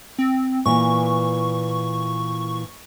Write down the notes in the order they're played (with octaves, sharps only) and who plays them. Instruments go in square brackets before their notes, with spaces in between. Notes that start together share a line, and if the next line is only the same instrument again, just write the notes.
[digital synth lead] C4
[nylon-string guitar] A#2 E3 [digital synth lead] C#6